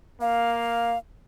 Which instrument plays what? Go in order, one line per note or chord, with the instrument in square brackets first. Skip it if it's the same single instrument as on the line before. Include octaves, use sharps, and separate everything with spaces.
[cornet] A#3 [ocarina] F5